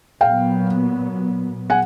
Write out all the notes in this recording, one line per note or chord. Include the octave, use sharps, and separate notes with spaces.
A#2 F#3 B3 F5 G5
F#5 G#5